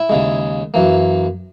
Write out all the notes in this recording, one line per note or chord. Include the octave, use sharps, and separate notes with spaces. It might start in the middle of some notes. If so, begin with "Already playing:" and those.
Already playing: E4
D#2 C#3 G#3
F#2 E3 A#3